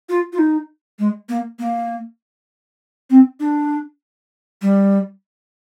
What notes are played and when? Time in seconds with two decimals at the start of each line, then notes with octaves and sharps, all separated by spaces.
0.09 F4
0.33 F4
0.38 D#4
0.99 G#3
1.29 A#3
1.59 A#3
3.10 C4
3.40 D4
4.62 G3